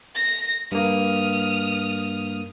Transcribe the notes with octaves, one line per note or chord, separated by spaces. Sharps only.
A#6
G2 A#3 D#6 F6